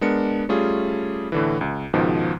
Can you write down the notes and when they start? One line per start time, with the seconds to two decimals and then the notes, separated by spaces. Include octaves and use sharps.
0.01 G#3 B3 D4 A#4 C#7
0.49 G3 A3 C#4 F4 G#4
1.32 A2 D3 E3
1.61 C#2
1.93 C#2 G#2 B2 D#3 F3